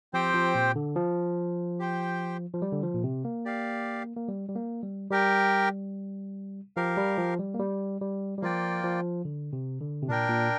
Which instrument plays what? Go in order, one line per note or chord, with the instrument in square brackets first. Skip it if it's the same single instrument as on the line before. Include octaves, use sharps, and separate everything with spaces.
[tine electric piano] F3 [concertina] C4 G4 C5 G5
[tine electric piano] F3
A#2
D3
F3
[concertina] G4 C5 G5
[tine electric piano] F3
G3
D3
F3
A#2
C3
A#3
[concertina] G4 D5 F5
[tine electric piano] A#3
G3
G3
A#3
G3
[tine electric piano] G3 [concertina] G4 A#4 G5
[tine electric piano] F3 [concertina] G4 A#4 F5
[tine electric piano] G3
F3
G3
A#3
G3
G3
G3
[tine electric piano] F3 [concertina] A#3 F4 D5 G5
[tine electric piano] F3
D3
C3
D3
C3
[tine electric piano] A#2 [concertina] D4 A#4 G5
[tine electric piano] A#2